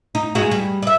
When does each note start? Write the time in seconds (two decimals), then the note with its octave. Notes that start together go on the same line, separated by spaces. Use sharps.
0.15 D#4
0.35 G2 G#3 F#4
0.51 G3
0.82 D5 E5